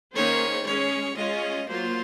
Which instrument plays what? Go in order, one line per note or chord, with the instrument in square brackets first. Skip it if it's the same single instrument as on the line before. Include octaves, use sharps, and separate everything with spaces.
[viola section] D#3 A#3 C#4 G#4 C5 [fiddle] C#5
[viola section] G#3 C#4 G#4 [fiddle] C#5
[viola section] G#3 C#4 F4 [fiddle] D#5
[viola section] F#3 A#3 F4 [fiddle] C5